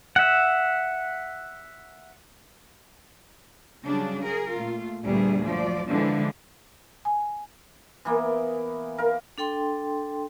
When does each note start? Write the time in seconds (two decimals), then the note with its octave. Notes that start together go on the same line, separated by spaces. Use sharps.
0.16 E5 F#5
3.85 C#3 F#3 G3 D4
4.23 G#4 A#4
4.53 A#2 A3 F4
5.04 D2 G2 A#2 G3 B3 G#4
5.46 F3 F#3 D5
5.89 D3 E3 F3 G#3 D4
7.05 G#5
8.05 E3 A#3 B3
8.98 A#4 F5
9.38 D4 A4 G5 C6